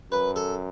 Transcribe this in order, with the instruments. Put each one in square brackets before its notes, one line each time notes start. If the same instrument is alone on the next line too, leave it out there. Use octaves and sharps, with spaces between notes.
[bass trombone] F#2 [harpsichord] B4
[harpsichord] A4